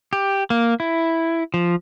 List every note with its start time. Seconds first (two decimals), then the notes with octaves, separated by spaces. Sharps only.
0.13 G4
0.50 A#3
0.80 E4
1.54 F3